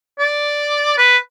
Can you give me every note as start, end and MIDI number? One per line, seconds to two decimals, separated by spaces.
0.19 0.95 74
0.98 1.17 71